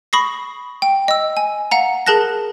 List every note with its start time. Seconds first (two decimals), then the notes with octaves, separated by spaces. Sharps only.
0.13 B5 C#6 D#6 A#6 C7
0.82 G5
1.08 D#5 E6
1.37 G#5
1.71 F5 F#5 A#5
2.06 G#4 A#4 A5 F#6 A#6